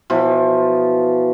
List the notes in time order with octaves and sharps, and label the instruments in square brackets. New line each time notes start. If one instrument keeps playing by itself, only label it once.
[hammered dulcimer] B2 E3 F3